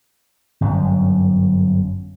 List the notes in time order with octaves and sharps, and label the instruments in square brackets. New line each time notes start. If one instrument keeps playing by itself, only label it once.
[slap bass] G1 F#2 F#3